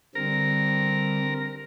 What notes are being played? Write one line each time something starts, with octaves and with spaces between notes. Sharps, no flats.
D3 G3 C4 A#4